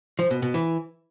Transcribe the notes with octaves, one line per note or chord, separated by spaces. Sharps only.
F3
B2
B2
E3